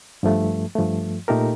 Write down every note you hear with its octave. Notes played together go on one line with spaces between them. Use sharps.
G2 F3 A3
G2 F3 A3
A#2 A3 D#4 G4 A#4